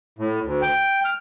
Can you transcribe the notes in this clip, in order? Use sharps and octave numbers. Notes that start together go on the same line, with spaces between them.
A2
D2
G5
F6